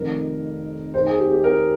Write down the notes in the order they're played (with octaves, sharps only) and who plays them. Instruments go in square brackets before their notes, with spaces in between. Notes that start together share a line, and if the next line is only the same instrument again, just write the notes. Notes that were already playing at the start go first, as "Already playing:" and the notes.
Already playing: [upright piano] F1 F2 D#3 A#4
D#2 C5
D#3
G#4
G4
G4
A#4